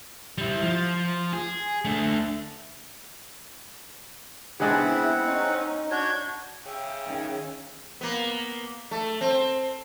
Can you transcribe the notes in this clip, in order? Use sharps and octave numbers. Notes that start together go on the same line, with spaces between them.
G3 E4
F3
G#4
A3 D4
C#3 G#3 B3 C4 D4 E4 G#4 F#5
C#4 D#4
D4 F#4 C#5 G6 G#6
C#3 E5 G5
D#3 C#4 G#4
A#3 B3
A3
C4